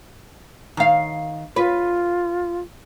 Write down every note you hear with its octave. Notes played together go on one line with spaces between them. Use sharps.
D#3 F5
F4 B4